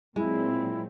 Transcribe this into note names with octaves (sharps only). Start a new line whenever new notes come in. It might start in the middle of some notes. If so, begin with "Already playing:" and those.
A#2 F#3 G#3 C4 E4